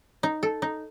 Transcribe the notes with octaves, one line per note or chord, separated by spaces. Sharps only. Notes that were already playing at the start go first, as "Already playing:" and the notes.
D#4
A4
D#4